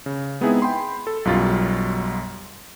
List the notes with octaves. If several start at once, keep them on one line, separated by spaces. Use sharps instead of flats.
C#3
G#3 B3 C4 D#4 E4 G#4
G5 B5 C6
A4
B1 F#2 G3 F4 F#4 A6